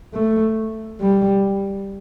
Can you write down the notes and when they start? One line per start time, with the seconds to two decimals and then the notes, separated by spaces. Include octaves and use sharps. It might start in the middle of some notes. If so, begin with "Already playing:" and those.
0.14 A3
1.01 G3